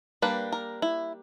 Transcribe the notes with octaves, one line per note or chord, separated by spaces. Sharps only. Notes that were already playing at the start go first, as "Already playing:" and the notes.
G3 A#3 D4 B4
A#4
E4